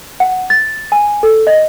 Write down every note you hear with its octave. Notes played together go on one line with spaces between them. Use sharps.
F#5
A6
G#5
A4
D#5